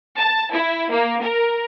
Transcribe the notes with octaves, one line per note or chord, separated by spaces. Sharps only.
A5
E4
A#3
A#4